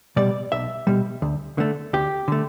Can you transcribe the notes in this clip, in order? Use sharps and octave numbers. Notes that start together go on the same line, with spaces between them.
B2 G3 D5
B1 E5
B2 G3
D2
D3 A3
D2 G4
D3 A3